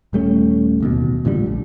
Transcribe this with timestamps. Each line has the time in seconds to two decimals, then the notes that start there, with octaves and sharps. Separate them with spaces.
0.13 D#1 G3 A3 C#4
0.80 D1 D#2 B2
1.25 A1 A#2 D3 G3
1.46 A#1